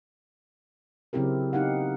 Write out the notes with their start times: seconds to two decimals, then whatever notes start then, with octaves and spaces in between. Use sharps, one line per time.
1.13 C#3 F#3 C4 E4 G4 A#4
1.53 B3 D#4 G4 F5 F#5